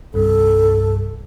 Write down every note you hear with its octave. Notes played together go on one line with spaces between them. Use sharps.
C2 G2 C3 A4